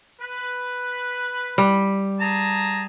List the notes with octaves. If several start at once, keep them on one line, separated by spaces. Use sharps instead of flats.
B4
G3
G#4 A5 A#5